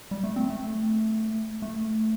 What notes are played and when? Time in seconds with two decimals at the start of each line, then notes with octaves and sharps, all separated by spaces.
0.11 G3
0.24 A3
0.36 C4
0.50 A3
1.62 A3